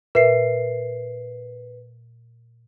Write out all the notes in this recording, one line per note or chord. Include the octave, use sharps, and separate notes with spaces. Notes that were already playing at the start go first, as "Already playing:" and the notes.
A#2 A#4 B4 E5 C7